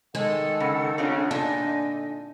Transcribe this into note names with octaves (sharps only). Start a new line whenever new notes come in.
D#3 G#3 A4 F#5
C#3
C#3 C4 D4 F4
A#2 D3 D4 D#4 D#5 G#5